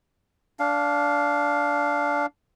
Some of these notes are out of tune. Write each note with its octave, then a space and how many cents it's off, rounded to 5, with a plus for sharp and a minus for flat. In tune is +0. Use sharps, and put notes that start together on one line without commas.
D4 -15 F5 +0